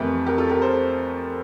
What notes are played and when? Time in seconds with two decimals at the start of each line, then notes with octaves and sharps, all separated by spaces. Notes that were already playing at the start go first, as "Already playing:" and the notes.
Already playing: F2 E3 A3 G4 A#4
0.26 G4 A#4
0.38 F4 A4
0.50 G4 A#4
0.62 A4 C5